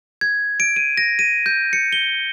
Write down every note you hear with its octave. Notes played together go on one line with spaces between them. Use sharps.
G#6
D7
D#7
A#6
D#7
G6
C#7
G7